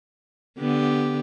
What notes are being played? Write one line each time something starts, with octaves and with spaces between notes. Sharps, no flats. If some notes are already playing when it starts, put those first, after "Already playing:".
D3 B3 G4